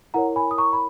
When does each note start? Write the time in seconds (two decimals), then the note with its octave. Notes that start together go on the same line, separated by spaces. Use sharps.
0.14 E4 A#4 C#5 F#5 A#5
0.36 G#5 B5
0.51 D#6
0.58 A#5 C#6
0.73 B5